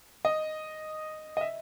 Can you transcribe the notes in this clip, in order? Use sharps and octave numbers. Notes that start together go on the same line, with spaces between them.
D#5
D#5
E5